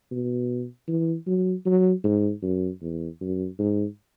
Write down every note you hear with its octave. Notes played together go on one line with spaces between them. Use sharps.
B2
E3
F#3
F#3
G#2
F#2
E2
F#2
G#2